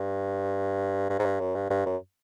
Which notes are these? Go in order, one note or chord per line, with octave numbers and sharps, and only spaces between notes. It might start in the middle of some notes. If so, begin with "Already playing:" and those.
Already playing: G2
G2
G#2
G2
F#2
G2
G2
F#2